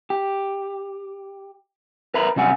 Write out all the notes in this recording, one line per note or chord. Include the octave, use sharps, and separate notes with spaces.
G4
A#4 B4 E5 A#5 B5
C3 G3 C#4 F#5 G#5